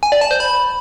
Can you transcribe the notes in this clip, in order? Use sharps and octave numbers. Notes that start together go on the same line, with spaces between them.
G#5
D5
A5
C5
B5